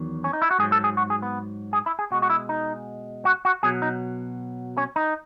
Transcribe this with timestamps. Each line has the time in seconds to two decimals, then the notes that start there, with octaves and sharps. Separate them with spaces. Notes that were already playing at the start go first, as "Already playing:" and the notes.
Already playing: E2 D#3 F#3
0.24 C#4
0.33 D#4
0.42 E4
0.51 F#4
0.59 G#2 G#4
0.63 F#3
0.72 A4
0.84 G#4
0.97 F#4
1.10 G#4
1.22 B3
1.73 G#4
1.86 E4
1.99 G#4
2.11 B2 G#3 F#4
2.22 F#4
2.30 E4
2.49 D#4
3.25 F#4
3.45 F#4
3.63 B2 F#3 G#4
3.82 D#4
4.77 C#4
4.96 D#4